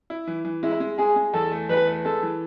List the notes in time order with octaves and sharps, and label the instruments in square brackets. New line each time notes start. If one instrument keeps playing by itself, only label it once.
[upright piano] E4
E3
E3
[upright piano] G#3 [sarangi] E4
[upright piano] G#3
[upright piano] G#3 [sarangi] G#4
[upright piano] G#3
[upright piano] E2 [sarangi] A4
[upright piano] A3
[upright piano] E2 [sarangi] B4
[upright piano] A3
[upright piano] G#3 [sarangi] A4
[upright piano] E3